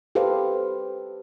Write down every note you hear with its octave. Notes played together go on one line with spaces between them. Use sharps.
G4 A4 B4 C5 F5